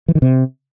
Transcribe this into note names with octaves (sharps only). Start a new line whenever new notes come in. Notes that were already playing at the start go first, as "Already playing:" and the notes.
E3
D#3
C3